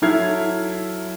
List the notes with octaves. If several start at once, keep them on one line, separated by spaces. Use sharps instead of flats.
F#3 E4 A4 F6 G#6 C7